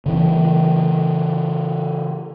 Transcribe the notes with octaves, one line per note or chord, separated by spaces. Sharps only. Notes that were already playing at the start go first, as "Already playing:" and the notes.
C#3 E3 C4